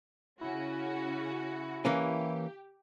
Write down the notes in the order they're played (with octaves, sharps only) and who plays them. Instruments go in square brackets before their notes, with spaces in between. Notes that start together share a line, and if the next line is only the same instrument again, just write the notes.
[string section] C#3 C#4 F#4 [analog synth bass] E4
[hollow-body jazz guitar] E3 A#3 C#4 [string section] G4